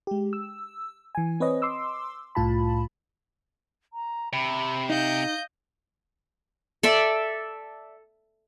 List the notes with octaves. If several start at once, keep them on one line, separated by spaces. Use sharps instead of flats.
G#3 G4
E6
E3 G#5
C4 B4 C#5 D#5
C6 D6 E6
C2 A2 F4 A5 B5
A#5
C3 B5
D#4 D#5 F5 G6
A4 D5 E5